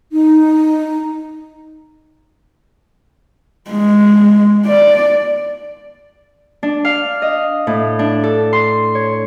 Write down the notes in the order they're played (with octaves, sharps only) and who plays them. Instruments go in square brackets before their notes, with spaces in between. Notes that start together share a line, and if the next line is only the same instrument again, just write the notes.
[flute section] D#4
[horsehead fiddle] G#3
D5
[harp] D4
F5
D#5
A2
D4
A4
C6
C#5